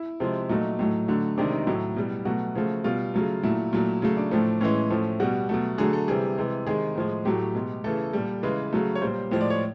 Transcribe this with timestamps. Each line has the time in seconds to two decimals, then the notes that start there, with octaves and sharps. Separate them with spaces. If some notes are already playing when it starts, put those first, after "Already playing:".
Already playing: E4
0.20 C3 F3 G#3
0.49 A#2 F#3 A3 D#4
0.79 A2 F#3 A3
1.08 D3 F#3 A3
1.38 C3 D#3 G#3 D4
1.52 D#4
1.67 A2 F#3 A3 E4
1.96 B2 G3
2.25 B2 F#3 A3 F#4
2.55 C#3 F3 A3
2.84 B2 G3 F4
3.14 C#3 F#3 A3
3.43 A#2 F#3 A3 E4
3.73 A#2 F#3 A3
4.02 C#3 F#3 A3
4.17 D4
4.31 A2 F3 A3
4.61 A2 E3 G#3 C#4
4.90 A2 F3 A3
5.20 B2 G3 F#4
5.49 B2 F#3 A3
5.78 D3 F#3 A3 G#4
5.93 A4
6.08 C3 E3 G3 G#4
6.38 C3 E3 G#3
6.66 C3 D#3 G#3 G#4
6.96 A2 F3 G#3
7.25 A2 F#3 A3 G4
7.55 B2 G#3
7.84 C#3 E3 A3 A4
8.13 A#2 G3
8.43 C#3 E3 G#3 B4
8.73 C#3 F#3 A3
8.95 C#5
9.01 A#2 G3 C5
9.31 A2 F3 G#3
9.41 D5
9.50 C#5